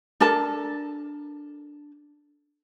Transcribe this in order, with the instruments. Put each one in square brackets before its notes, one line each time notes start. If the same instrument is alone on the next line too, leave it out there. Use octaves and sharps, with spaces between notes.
[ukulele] D4 A4 A#4 A5